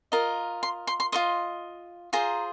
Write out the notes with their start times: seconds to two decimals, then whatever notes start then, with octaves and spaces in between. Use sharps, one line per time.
0.12 F4 A#4 D#5
0.63 C6
0.87 C6
1.00 C6
1.12 F4 A#4 D#5 C6
2.13 F4 G#4 C5 A#5